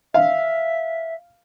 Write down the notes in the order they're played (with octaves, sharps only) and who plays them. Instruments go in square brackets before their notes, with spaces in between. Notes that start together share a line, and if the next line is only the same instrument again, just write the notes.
[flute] E5 [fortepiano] F5